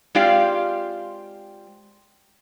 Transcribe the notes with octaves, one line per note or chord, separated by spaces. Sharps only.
G#3 C4 F4 G4 D5 F5